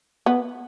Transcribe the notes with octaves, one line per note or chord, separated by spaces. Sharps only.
B3